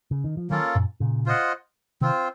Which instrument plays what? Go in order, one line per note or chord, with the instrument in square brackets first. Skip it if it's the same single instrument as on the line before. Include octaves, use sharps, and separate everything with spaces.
[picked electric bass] C#3
D#3
F3
[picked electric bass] D#3 F#3 [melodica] A#3 C#4 F4 A4
[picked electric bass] F#2 A#2
A#2 C#3
[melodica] F4 C5 D#5 F#5
[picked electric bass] C3 D#3 [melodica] C4 F4 C5